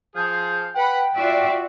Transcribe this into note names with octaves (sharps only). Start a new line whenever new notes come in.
F3 G#4 F5 G6
B4 F#5 G5 B5
F4 F#4 D5 E5